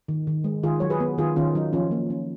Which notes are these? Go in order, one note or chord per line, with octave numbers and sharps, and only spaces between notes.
D#3
D#3
G#3
D#3 F4 G#4
F#3 C#5
G#4 B4
B3
D#3 F4 G#4
D#3 C#4 F4
F#3 D#4
F3 C#4 F4
A#3
C#4